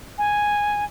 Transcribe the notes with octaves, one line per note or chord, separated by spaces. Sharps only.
G#5